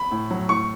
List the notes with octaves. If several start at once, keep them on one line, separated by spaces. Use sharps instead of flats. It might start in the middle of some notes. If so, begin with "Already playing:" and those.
Already playing: B5
A2
F#3
A2 C#6